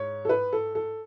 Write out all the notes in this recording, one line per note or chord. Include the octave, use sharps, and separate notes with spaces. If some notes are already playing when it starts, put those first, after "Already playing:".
Already playing: G#2 C#5
A4
B4
A4
A4